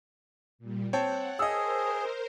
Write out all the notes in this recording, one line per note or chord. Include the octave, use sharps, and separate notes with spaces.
A#2 G3
C4 C#5 F#5 G5 A5
G#4 A#4 C5 D#5 E6